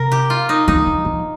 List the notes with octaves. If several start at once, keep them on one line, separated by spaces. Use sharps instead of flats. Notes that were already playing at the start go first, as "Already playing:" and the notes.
Already playing: C3 A#4
G4
F4
D#4
D#3 D#4
F3
F3